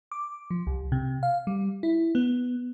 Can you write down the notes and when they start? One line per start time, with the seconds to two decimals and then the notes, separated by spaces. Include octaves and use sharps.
0.12 D6
0.51 F3
0.67 C2
0.92 C3
1.23 F5
1.47 G3
1.83 E4
2.15 B3